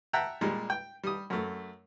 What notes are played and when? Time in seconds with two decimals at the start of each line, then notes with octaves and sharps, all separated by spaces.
0.13 E5 F#5 G5 A5 A#5
0.41 A#2 G3 G#3
0.70 G5
1.03 G3 D#6
1.30 F#2 A3